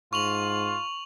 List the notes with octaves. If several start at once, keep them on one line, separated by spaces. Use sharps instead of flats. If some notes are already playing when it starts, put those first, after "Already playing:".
G#2 F4 C#6 F7 F#7